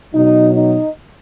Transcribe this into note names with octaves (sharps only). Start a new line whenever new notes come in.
B2 F#3 D#4
D#4